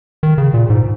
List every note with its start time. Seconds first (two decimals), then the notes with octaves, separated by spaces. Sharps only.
0.23 D#3
0.38 C#3
0.54 A#2
0.70 G#2